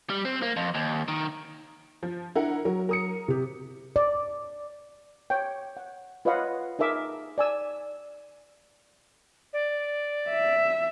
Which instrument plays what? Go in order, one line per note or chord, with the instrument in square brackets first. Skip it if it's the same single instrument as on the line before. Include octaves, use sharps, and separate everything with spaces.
[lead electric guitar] G3
C4
A#3
F2
D#2
D#3
[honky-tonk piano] F3
[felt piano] D4 [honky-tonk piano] E4 A#4 F#5
[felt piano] F#3 [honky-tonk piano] A#4
[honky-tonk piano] A#4 D#6 C#7
[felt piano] C3 G4
[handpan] D5
[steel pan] C#5 G5
F#5
F4 B4 C#5 D#5 F5 F#5
D#4 G#4 A#4 E5 D6
D5 G#5 E6
[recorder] D5
[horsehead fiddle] E5